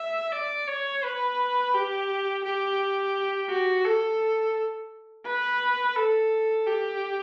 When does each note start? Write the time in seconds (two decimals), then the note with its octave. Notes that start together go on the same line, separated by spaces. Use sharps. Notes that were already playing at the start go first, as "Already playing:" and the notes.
Already playing: E5
0.32 D5
0.68 C#5
1.03 B4
1.74 G4
2.44 G4
3.49 F#4
3.85 A4
5.26 B4
5.96 A4
6.67 G4